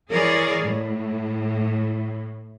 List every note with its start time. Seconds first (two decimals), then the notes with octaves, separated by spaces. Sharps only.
0.11 E3 G#4 A#4 C#5 D5
0.60 A2